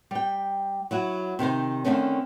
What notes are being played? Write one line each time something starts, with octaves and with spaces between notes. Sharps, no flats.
G3 G5
F#3 E4 F#4
C3 D#3 D#4 C5
D3 D#3 F#3 A3 C4 C#4